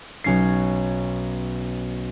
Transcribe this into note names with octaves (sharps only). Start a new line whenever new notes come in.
B1 C#4 C7